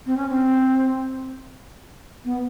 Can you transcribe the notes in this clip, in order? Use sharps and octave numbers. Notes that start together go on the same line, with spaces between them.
C4
C#4
C4
B3